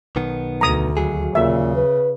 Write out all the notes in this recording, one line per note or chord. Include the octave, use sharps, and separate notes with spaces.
B1 D#3 B3
D2 A#5 D#6
D#2 F#3 G#4
A#2 C#3 E5
B4